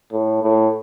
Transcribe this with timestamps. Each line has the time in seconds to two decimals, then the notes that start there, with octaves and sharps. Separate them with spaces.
0.12 A2
0.42 A2